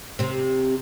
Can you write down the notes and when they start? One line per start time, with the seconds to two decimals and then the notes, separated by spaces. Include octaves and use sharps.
0.19 C3 C4